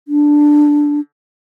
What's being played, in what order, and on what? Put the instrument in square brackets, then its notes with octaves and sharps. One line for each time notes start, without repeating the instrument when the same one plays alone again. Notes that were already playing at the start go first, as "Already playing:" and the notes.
[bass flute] D4